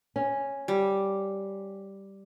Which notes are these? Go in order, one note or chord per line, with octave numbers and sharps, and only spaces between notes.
C#4
G3